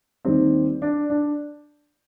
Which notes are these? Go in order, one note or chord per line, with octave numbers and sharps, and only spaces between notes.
D#2 D#3 G3 C4
D4
D4